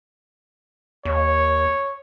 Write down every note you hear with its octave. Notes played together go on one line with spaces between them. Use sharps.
D#2 C#5